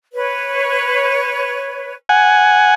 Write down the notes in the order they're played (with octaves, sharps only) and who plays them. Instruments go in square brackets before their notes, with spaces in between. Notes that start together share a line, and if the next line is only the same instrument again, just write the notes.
[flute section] B4 C#5
[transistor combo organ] F#5 G#5